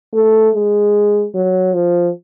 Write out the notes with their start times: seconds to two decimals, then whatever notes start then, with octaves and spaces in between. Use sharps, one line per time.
0.14 A3
0.55 G#3
1.35 F#3
1.74 F3